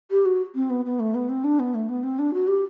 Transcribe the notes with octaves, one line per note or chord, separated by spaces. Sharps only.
G4
F#4
C4
B3
B3
A3
B3
C4
D4
B3
A3
B3
C4
D4
F#4
G4